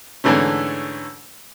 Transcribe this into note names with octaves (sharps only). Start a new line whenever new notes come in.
G#2 D3 E3 A3 C#4